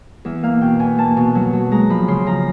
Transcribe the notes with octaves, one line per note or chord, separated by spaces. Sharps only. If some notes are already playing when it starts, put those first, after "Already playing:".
E2 E5
A#3 F5
B2 G5
E2 G#5
A#3 A5
B2
F#3
F#3
G#3 A#5
F3 B5
C#3 C6
F3 A#5